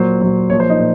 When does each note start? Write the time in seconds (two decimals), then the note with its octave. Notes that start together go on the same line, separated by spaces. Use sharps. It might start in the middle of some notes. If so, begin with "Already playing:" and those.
Already playing: A#2 F#3 C5
0.21 A#2 F#3
0.50 A#2 F3 C#5
0.60 C5
0.70 D#4
0.79 A#2